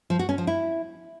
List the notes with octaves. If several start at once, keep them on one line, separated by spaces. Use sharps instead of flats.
F3
F#4
C#4
F3
E4